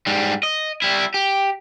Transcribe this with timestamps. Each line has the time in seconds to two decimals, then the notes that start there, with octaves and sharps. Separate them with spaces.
0.07 G#2 G3
0.43 D#5
0.82 G3 E4
1.14 G4